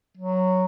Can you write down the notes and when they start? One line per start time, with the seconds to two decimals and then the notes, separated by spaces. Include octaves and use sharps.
0.17 F#3